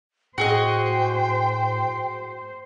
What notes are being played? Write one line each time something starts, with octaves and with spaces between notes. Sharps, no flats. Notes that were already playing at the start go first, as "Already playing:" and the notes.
A2 F#4 G#4 C5 D#5 G5